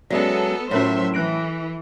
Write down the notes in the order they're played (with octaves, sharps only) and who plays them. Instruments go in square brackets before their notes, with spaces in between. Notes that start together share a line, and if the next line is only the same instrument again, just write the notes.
[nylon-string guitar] F#3 G#3 C#4 [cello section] B3 A4 [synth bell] D5 E5
[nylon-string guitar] A2 [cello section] F#3 C5 E5 [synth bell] C#4 A#4 C#5
[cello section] E3 [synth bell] F#6 A#6 D7